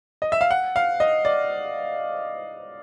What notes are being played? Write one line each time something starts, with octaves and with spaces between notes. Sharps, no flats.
D#5
E5
F5
F#5
F5
D#5
D5